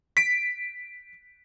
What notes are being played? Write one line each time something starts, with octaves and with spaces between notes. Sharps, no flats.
B6 D7